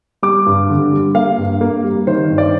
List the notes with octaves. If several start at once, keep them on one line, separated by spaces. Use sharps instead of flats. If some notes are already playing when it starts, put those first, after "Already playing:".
G3 D6
G2
D3
G3
A#3 F5
G2
A#3
G3
D#3 C5
G2
D5